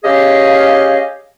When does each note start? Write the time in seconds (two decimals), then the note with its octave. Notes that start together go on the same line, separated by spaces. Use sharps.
0.04 C#4 G4 G#4 D#5 F5